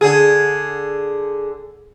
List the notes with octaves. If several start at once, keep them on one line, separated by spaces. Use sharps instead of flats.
D3 G#4